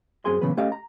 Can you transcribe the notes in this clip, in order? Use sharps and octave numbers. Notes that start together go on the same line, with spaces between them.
F#2 C4 G#4 G#5 C6
A#2 C#3 E3 F#3 B3 B4
A3 C#4 G4 A4 D#5 F5
A#5